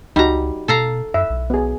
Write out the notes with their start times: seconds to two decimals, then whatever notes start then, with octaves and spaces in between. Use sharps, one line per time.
0.16 C#2 G3 D#4 F#4 A#5
0.68 B2 A4 F5 A#5
1.14 F#2 E5
1.30 B1
1.50 B3 G#4